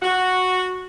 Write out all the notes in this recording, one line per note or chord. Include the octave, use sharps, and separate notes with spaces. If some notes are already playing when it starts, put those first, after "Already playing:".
F#4